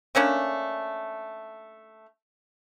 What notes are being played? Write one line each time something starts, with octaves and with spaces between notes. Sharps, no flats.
A3 A#3 C#4 D4